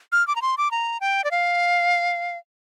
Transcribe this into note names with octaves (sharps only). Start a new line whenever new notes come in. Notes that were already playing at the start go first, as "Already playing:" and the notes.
F6
D6
A#5
C6
D6
A#5
G5
D5
F5